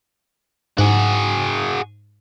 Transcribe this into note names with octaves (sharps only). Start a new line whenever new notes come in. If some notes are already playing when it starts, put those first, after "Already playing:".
G#2 F#4 G#4